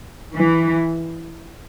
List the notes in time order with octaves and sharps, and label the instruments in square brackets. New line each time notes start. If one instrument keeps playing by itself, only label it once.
[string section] E3